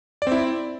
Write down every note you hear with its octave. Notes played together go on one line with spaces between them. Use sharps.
C4 E4 D5